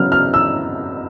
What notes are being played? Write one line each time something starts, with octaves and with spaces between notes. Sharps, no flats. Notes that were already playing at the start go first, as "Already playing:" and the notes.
Already playing: C#3 F#3 B3 F6
F6
E6